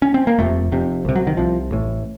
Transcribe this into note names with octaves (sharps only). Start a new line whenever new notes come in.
C#4
C4
A#3
F1 F2 C3 A3
F1 F2 C3
C2 C3
F#3
D#3
C2 C3 F3
A1 A2